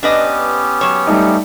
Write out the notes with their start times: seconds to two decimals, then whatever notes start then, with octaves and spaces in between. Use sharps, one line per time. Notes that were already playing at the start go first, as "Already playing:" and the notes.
0.03 B3 C#4 D4 G4 B4 D#5
0.81 F#3 C#5
1.07 G3 A3 D#4